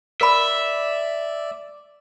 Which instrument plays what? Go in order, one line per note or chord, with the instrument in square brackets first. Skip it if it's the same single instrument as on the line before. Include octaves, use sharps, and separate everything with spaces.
[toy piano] A#4 B5 [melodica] D5 [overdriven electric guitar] E5